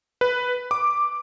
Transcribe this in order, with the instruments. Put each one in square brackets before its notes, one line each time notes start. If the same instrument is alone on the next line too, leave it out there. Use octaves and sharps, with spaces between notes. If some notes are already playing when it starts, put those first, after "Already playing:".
[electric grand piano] B4
D6